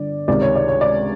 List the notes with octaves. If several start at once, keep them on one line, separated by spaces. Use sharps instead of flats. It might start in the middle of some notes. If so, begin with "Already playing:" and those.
Already playing: G1 D3 D5
C#2 C3 D#3 D5
C#5
D5
C#5
D5